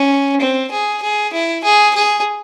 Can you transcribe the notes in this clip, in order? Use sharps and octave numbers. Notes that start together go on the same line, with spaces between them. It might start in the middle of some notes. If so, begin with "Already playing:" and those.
Already playing: C#4
C4
G#4
G#4
E4
G#4
G#4